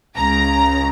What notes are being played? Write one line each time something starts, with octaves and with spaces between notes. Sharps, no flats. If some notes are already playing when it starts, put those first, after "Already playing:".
C#2 C#3 A#5